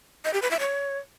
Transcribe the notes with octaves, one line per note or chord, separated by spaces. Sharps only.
D#5
G4
B4
E5
C#5